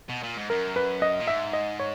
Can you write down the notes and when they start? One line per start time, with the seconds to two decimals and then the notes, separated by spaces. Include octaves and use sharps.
0.10 B2
0.23 A#2
0.37 G#2
0.50 F#2 A#4
0.76 B4
1.02 D#5
1.20 A#2
1.27 G#2 E5
1.53 D#5
1.80 C#5